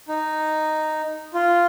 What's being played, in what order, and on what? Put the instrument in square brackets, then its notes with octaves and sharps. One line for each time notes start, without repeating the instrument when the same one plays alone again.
[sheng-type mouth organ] D#4
F4